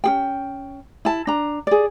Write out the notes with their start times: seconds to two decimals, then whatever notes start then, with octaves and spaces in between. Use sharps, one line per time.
0.04 C#4 G#4 G5
1.05 E4 A5
1.27 D4 A#5
1.67 G#4 D5